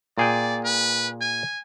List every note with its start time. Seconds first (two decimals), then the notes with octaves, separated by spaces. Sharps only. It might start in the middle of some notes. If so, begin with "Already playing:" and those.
0.18 A#2 G#4 D5 G5
0.64 B4
1.21 G#5